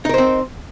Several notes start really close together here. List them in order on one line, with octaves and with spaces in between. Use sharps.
D#4 A#4 C5 C4